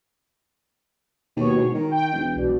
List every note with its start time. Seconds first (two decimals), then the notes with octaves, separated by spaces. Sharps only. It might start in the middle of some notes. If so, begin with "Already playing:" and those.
1.36 D#2 B2 C#5
1.57 G#2
1.75 D#3 A#4
1.91 G5
2.13 E1
2.35 B1 B2 D5